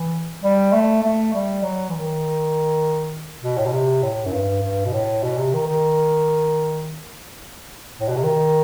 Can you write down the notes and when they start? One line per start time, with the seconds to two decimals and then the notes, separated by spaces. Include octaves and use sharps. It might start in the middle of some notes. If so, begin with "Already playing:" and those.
Already playing: E3
0.43 G3
0.73 A3
1.03 A3
1.34 G3
1.63 F#3
1.89 E3
1.93 D#3
3.43 B2
3.58 A2
3.66 B2
3.73 C3
4.03 A2
4.26 F#2
4.33 G2
4.63 G2
4.86 B2
4.93 A2
5.23 B2
5.38 C3
5.54 D#3
5.68 D#3
8.00 A2
8.09 B2
8.16 C3
8.23 D#3